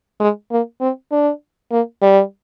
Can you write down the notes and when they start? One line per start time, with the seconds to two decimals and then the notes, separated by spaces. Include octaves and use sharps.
0.20 G#3
0.51 A#3
0.81 C4
1.12 D4
1.71 A#3
2.02 G3